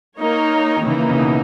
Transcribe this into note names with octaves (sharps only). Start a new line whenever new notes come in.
A#3 D#4 A#4 C#5
D#3
C#3 E3 A#3 D#4
C#3
B2